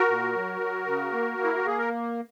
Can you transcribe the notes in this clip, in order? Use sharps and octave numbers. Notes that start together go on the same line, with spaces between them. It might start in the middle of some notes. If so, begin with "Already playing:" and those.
Already playing: F#4 A#4
A#2
F#3
F#3
C#3
A#3
A#3
E4
F#4
A#3 G#4
A#4